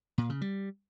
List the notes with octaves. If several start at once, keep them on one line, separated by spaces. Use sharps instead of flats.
A#2
C#3
G3